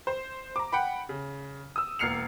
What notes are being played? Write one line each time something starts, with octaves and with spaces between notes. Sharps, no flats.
C5
A#5 D6
F#5 G5 B5
C#3
D#6 E6
E1 A#3 F6 C7 C#7 F7